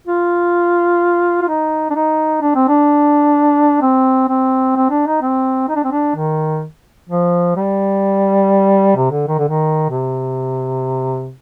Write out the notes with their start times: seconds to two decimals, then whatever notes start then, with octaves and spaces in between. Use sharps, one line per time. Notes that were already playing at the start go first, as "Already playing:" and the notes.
0.07 F4
1.42 F4
1.48 D#4
1.90 D4
1.95 D#4
2.41 D4
2.55 C4
2.69 D4
3.82 C4
4.28 C4
4.76 C4
4.90 D4
5.07 D#4
5.22 C4
5.69 D#4
5.76 D4
5.84 C4
5.91 D4
6.16 D#3
7.09 F3
7.56 G3
8.96 C3
9.11 D3
9.28 D#3
9.38 D3
9.48 D#3
9.90 C3